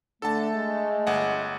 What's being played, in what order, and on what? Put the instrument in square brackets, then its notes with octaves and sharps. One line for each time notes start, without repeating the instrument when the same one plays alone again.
[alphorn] D3 [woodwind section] A3 [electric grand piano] A4 A5
[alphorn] G#3
[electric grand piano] G1 F#5